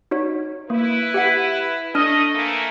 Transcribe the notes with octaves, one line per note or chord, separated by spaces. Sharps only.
D#4 F#4 C#5
A#3 E4 B4
G4 E5 F#5
A3 D4 D#5 D#6 F6
E3 A3 A#3